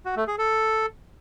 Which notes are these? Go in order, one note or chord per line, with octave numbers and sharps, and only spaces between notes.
F#4
A3
G#4
A4